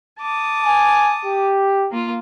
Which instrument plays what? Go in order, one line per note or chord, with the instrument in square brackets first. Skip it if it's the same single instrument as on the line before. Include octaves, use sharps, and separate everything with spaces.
[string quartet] A5 D6 D#6
[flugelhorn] G#5
G4
[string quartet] A#3 F4